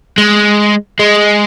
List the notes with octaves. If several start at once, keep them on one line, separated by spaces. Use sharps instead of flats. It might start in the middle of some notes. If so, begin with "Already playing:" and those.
G#3
G#3